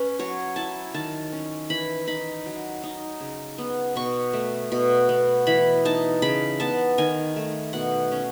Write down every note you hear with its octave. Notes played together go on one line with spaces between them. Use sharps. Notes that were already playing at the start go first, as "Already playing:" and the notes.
Already playing: C#4 B4
F#3 C#5
E4 A5
D#3 A5
C#4
E3 B5
D#4 B5
F#3
D#4
C#3
B3
B2 C#6
A3
B2
B3
E3 B5
D#4 A5
C#3 B5
B3 A5
D#3 G#5
A3
B2 F#5
C#4